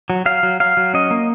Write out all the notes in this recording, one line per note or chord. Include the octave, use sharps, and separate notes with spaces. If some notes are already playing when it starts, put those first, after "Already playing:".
F#3
F#3 F5
F#3
F#3 F5
F#3
C#4 D#5
A#3